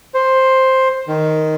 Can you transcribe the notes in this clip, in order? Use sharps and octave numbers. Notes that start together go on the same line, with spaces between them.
C5
D#3